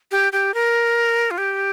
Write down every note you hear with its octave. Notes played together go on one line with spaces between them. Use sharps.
G4
G4
A#4
F4
G4